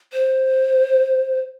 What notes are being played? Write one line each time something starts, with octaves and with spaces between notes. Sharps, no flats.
C5